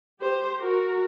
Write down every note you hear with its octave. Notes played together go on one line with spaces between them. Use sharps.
G4 C5
F#4 A#4